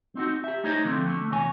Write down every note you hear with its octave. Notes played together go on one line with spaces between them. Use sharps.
C4 D#4 F#4
G4 E5
A3 D#4 C5 C#5 D#5
D3 F3 A3 A#3 C4
D3 A3
E2 C3 C#5 G#5